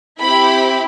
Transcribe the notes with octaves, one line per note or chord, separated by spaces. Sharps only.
C4 E4 G4 B5